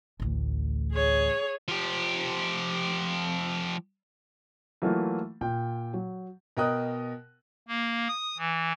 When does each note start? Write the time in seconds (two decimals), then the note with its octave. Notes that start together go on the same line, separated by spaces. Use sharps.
0.20 A1 D2
0.93 G#4 C#5
1.68 F3 G4
4.82 E3 F#3 A3 A#3 F4
5.41 A#2 G5
5.94 F#3
6.57 B2 A#4 D#5 G5 D#6 F#6
7.68 A#3
8.08 D#6
8.38 E3